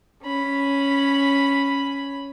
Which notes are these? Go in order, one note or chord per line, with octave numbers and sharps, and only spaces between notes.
C#4 B5